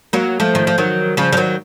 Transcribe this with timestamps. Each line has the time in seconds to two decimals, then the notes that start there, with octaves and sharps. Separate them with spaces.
0.13 F#3 A#3
0.40 F3 A3
0.55 D#3
0.67 F3
0.78 D#3 F#3
1.17 C#3 F3
1.32 F3
1.37 D#3 F#3